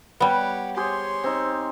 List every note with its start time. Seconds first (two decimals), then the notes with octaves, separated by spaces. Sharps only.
0.20 G3 B3 G4 C#5 F#5
0.77 G4 G#4 C5 C#5 C6
1.24 C4 D#4